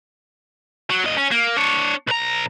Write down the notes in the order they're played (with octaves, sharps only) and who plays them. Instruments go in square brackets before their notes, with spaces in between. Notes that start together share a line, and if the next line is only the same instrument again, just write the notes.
[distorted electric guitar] F#3
D2 D#5
C#4
A#3
D4 C#5
B1 A#5